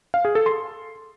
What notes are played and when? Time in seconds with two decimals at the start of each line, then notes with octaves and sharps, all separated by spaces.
0.14 F5
0.25 G#4
0.35 A4
0.46 C6